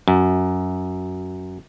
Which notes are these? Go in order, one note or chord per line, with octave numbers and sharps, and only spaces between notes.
F#2